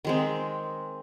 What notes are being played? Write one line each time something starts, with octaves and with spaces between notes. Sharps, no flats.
D#3 G#3 C4